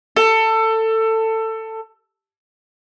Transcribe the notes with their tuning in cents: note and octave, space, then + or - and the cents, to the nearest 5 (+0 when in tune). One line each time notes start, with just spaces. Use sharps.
A4 +20